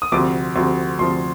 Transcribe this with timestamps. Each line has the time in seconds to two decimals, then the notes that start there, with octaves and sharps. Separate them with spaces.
0.02 D#6
0.12 D2 C3 F3 D6
0.56 D2 C3 F3
0.99 D2 C3 F3 C6